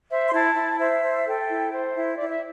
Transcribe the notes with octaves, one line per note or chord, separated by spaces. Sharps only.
C5 E5
C6
E4 A5
E4
C5 E5
C5
A4 G5
E4
C5
E4
E4 D5
E5